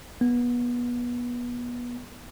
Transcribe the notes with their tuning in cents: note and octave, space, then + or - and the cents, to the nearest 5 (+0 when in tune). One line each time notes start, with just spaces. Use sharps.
B3 -25